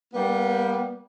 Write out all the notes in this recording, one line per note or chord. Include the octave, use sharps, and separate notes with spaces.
G3 A#3 B3